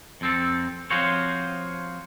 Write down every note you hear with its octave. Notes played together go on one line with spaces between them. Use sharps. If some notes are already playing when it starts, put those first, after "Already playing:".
F2 C4 A4
F3 C4 F4 F#4 C5 C#5